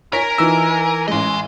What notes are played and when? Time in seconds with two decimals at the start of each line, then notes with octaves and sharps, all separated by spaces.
0.13 A#4 C#5 G#5 A#6 B6
0.38 E3 D#4 F4 E6
1.08 A1 G#3 D#5 C6